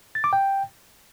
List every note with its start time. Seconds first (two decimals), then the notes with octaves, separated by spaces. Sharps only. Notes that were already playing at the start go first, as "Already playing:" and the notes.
0.15 A6
0.24 D6
0.33 G5